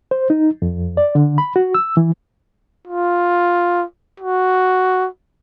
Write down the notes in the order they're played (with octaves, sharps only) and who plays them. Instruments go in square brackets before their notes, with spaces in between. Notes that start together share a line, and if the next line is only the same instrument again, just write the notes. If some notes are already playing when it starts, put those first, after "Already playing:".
[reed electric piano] C5
D#4
F2
D5
D3
B5
F#4
E6
E3
[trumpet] F4
F#4